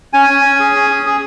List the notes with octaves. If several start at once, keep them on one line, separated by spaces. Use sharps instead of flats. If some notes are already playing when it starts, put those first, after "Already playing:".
C#4 G#5
C#4
C#4
G#4
C#4
G#4
G#4